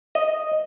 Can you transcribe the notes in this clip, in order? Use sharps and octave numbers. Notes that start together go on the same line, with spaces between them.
D#5